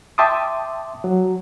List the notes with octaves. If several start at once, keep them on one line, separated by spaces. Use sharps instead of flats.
E5 G5 A5 C6 D6 D#6
F#3